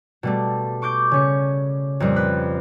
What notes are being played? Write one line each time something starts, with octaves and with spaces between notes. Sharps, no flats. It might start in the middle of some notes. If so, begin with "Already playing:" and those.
B2 G3 A3
C#6 D6 G6 D7
C#3 C#4 C#7
F2 A#2 G3
B4